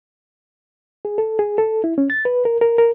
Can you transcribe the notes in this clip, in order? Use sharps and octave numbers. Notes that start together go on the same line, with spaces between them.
G#4
A4
G#4
A4
E4
C#4
A6
B4
A#4
A#4
A#4